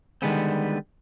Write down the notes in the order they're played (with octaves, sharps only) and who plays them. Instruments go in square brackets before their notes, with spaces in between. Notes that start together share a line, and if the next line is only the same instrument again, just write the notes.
[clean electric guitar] D3 D#3 G3 G#3 B3 C4